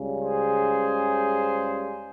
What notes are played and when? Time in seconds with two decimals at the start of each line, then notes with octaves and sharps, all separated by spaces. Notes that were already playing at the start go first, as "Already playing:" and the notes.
Already playing: C#2 C#3 G3
0.22 G#4 C5